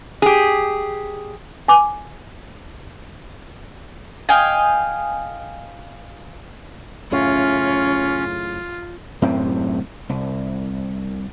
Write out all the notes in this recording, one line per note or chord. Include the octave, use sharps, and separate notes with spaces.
G4 G#4
G#5 D6
D#5 F5 G5 G#5
F#2 A2 C#3 C#4 F4
F#2 A2 C3 C4
C2